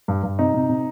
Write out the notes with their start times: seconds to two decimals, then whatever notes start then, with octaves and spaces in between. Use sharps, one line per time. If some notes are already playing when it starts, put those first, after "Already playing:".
0.08 G2
0.23 G2
0.39 C3 D#4
0.54 C3
0.69 C3